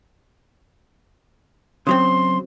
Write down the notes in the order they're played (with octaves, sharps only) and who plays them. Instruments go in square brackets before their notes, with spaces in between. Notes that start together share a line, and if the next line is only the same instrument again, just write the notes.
[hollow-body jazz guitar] C#3 F#3 C4 [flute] C6